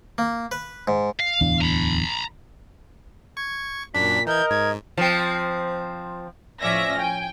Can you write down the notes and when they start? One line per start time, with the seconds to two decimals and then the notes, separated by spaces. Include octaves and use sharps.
0.18 A#3
0.51 B4
0.88 G#2
1.20 F5
1.41 D1 E2 D4
1.61 A#5 B5
3.37 C#6 G#6
3.94 F#2 A#2 D4 B6
4.27 E3 A#4 D#5 G6 G#6
4.50 G#2 G#6
4.97 F3 C4
6.60 A2 F3 C#4 D5 E5 A#6
6.98 G5 G#5